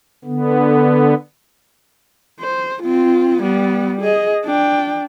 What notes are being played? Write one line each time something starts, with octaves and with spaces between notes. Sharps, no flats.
D3 B3
C5
C4 F4
G3 B3
G#4 D#5
D4 G5